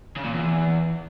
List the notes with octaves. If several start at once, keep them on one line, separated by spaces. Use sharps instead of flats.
C#3
A#2
E2